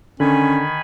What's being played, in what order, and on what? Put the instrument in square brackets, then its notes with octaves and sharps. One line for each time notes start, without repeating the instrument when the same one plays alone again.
[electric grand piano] D3 [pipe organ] D#3 G#5 B5 [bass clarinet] C#4